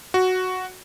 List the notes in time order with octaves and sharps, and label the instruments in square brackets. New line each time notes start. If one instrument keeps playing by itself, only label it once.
[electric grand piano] F#4